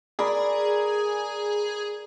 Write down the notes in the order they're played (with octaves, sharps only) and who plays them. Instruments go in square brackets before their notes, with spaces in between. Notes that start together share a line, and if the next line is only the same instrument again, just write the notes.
[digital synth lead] G#4 [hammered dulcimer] A#4 D5 B5